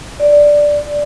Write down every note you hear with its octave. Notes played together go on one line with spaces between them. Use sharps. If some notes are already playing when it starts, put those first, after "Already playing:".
D5